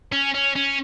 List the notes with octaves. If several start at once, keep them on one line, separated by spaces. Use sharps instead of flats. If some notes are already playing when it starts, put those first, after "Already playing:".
C#4
C#4
C#4